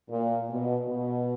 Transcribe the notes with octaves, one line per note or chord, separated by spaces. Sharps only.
A#2
B2
B2